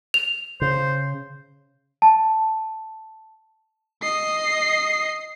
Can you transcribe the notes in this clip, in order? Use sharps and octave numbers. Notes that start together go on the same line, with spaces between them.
F7
C#3 C5
A5
D#5 C7